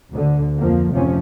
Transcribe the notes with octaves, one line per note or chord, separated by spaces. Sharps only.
D2 D3
F2 F3 A#3
F1 C3 F3 C#4